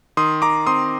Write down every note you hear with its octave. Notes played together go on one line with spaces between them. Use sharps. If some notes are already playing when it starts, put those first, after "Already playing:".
D#3 C6 D#6
D#3 A#5 D6
C4 C6 D#6